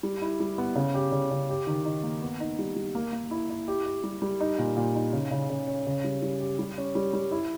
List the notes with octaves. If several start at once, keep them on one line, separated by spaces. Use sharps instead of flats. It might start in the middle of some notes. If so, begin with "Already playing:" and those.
G3
E4
G3
B3
C#3
G4
C#3
C#3
G4
D#3
D#4
A#3
B3
D#4
G3
G3
A#3
A#3
E4
E4
G4
G4
G3
G3
D#4
A#2
A#2
D#4
C#3
C#3
C#3
C#4
C#3
G3
G3
G4
G3
C#4
G3
G3
E4